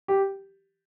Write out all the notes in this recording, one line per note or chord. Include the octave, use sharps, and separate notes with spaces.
G4